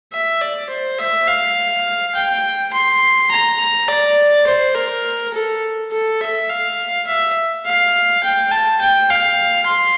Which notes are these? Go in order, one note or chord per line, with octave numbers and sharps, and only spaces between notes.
E5
D5
C5
E5
F5
G5
C6
A#5
A#5
D5
C5
A#4
A4
A4
E5
F5
E5
F5
G5
A5
G5
F5
C6